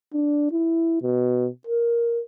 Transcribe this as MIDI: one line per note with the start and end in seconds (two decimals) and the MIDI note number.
0.14 0.50 62
0.52 0.99 64
1.02 1.48 47
1.67 2.22 70